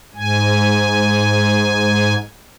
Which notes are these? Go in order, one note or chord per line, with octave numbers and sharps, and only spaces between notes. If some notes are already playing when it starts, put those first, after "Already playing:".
G#2 G#5